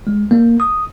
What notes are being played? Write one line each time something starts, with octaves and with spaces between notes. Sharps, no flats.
G#3
A#3
D#6